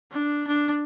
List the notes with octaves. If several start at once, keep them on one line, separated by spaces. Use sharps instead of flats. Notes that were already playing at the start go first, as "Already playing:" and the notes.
D4
D4